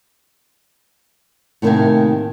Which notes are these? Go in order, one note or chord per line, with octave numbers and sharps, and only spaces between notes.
A2 C3 D#3 A#3 E5 G#5